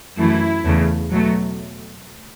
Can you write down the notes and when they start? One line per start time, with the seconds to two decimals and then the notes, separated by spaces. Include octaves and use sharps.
0.18 F#2 E3 A3 E4
0.64 E2 C#3 A3
1.11 B2 F#3 A3